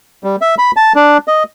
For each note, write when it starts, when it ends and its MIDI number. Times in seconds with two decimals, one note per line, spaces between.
0.24 0.36 55
0.41 0.55 76
0.58 0.71 83
0.77 0.93 81
0.95 1.17 62
1.28 1.43 75